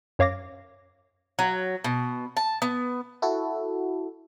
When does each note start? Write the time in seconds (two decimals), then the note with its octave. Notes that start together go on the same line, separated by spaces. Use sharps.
0.19 F#2 C#5 F5 D6 A#6
1.39 F#3
1.84 B2
2.37 A5
2.62 B3
3.22 E4 F#4 A4